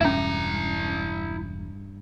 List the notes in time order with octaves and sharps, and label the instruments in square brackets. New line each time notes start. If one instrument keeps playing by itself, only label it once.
[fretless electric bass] E1 [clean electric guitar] G2 [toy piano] C#4 E5 [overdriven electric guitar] E4 A#5